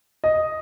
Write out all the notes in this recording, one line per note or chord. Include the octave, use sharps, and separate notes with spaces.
D#5